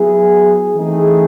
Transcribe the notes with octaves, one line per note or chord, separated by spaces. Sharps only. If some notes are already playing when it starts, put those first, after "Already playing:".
Already playing: F#3 B3 E4 G#4
E3 A3 C4 D#4 G#4